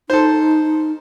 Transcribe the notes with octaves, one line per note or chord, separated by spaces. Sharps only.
D#4 A4 C5